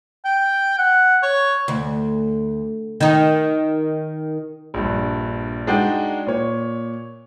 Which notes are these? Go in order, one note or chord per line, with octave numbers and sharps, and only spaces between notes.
G5
F#5
C#5
D2
D#3 D#4
A#1 G2
G#3 D4 D#4 F#4 D5 G5
A#2 C#5